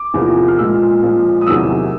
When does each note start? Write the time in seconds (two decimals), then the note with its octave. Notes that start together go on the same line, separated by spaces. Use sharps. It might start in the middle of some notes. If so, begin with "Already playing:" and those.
Already playing: D6
0.14 E2 C3 F3 A#3
0.48 F6
0.58 A#2 F3 G#3 E6
1.02 A#2 F3 G#3
1.41 D#6
1.47 E2 C3 D#3 F#3 A#3 E6